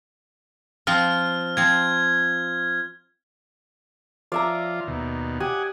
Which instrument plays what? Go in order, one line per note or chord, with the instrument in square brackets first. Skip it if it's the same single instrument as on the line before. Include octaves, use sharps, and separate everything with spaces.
[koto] F3 C4 F4 [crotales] F6
[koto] F3 C4 [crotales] G#6
[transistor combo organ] F3 F4 [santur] D5 E5 A#5
[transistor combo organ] D#2 B2
[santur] G4 [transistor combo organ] F#5 G#5 D#6